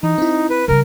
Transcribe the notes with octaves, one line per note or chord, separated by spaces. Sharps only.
E3 D#4
C4 E4
B4
C#3 G3 A#4